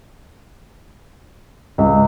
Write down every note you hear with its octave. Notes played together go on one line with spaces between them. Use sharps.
C#2